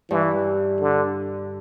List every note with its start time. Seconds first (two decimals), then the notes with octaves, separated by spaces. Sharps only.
0.11 G2 E3
0.81 D3